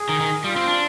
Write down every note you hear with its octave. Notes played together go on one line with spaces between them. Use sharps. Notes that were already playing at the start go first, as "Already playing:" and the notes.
Already playing: G#4
D#3
D#3
G3 F4
C4
D4